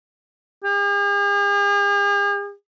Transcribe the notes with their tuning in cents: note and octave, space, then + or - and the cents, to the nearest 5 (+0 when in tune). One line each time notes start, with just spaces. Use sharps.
G#4 -45